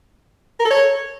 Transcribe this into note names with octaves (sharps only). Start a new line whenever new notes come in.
A#4
A4
C#5